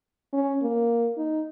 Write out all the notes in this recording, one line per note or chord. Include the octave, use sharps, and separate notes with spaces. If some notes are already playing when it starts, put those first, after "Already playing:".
C#4
A#3
D#4